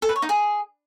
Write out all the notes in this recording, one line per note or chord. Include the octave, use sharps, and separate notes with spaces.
A4
B4
C#5
D#4
G#4